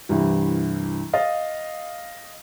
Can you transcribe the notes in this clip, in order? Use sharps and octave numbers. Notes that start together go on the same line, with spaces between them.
C2 G2 E3
D#5 F5 A6